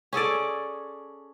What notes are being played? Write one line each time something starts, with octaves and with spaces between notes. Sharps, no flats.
C#4 G#4 A4 D5